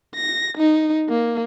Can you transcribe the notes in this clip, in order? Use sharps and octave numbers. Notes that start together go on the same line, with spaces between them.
A#6
D#4
A#3